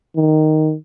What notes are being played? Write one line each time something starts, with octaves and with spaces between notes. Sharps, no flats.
D#3